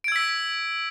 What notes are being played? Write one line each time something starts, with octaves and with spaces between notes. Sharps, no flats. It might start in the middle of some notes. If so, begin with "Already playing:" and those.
E6 G#6 B6 D7